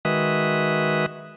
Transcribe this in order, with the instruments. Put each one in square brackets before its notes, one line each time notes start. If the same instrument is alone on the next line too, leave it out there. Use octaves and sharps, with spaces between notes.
[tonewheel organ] D#3 G#3 F#4 B4 E5 D#6